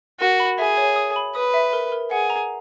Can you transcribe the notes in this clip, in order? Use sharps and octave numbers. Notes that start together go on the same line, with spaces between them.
F#4 A#4
B5
G#4 E5
C#5
D#6
B5
B4 D#6
E5
A#4
A#4
G#4 F#5
A#5